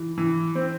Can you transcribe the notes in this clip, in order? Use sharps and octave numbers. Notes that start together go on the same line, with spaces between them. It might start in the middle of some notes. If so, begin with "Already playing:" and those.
Already playing: E3
E3
C4